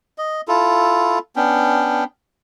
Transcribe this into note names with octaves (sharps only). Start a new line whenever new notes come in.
D#5
E4 F4 A4
B3 C#4 D4 G5